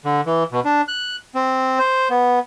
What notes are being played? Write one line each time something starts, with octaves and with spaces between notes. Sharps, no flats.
D3
E3
B2
D4
F#6
C4
C5
B3